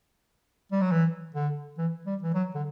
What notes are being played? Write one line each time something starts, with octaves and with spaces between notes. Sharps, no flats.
G3
F#3
E3
D3
E3
G3
E3
F#3
D3